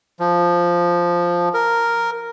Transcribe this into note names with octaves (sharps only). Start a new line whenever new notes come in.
F3
A#4